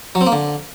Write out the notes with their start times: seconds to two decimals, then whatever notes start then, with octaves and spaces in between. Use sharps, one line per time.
0.15 F#3
0.21 C4
0.27 A#3
0.32 D3